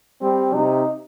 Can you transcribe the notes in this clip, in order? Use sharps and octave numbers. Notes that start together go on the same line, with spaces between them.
G3 C4
C3 D#4